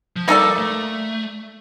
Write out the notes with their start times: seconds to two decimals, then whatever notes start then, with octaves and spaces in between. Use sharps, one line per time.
0.16 F3
0.28 G3 A#3 D#4 A4 D5
0.58 A3